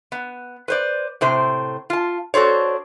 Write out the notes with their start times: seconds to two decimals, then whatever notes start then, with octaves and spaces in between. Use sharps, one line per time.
0.12 B3
0.68 B4 C5 D5
1.21 A2 C3 C5
1.90 F4 A5
2.34 D4 F#4 A4 C5 C#5